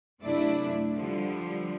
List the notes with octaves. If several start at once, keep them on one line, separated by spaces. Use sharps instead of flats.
F#2 C3 A3 D4 E4 D5
D3 F3 G3